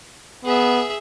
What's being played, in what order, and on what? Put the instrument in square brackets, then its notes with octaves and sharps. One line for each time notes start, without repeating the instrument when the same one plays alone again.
[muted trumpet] B3 [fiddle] G#4 E5